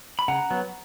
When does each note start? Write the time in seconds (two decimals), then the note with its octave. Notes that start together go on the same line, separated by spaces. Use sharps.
0.19 B5
0.28 C#3 F#5 A#5
0.51 F#3 B3